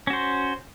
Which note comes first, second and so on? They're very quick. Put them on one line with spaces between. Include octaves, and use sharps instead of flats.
C#4 F#4 C5